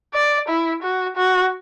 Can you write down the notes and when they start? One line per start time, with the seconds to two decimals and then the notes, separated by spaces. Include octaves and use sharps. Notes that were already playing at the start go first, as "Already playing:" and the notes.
0.14 D5
0.49 E4
0.83 F#4
1.17 F#4